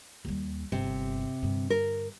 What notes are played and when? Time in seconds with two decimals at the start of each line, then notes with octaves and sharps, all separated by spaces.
0.25 D#2 G3
0.72 G1 C3
1.43 G2 D3
1.70 A#4